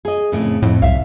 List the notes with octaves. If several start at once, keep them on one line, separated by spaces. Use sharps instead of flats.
G#4 D#5
F2 A2 C#3
F2 A2
C2 E5 F5